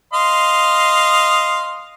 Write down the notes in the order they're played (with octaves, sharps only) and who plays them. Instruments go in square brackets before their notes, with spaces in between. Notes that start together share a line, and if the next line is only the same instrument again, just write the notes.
[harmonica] D#5 F5 C6